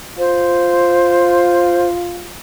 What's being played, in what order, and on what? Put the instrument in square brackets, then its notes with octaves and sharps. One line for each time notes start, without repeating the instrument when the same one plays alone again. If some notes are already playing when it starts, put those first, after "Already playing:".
[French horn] F4 [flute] C5